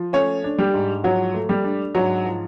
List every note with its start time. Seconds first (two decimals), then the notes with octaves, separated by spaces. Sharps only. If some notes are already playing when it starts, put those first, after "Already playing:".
Already playing: F3
0.13 A3 C#4 C#5
0.44 D4
0.59 G3 G4
0.74 G#2
1.04 F3 F#3 F#4
1.34 A3
1.49 G3 G4
1.64 D4
1.94 G#2 F#3 F#4
2.25 F3